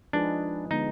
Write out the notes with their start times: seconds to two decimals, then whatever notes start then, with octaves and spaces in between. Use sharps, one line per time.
0.13 F3 G#3 D4 D#4 G#4 B4
0.70 D3 G#3 B3 D#4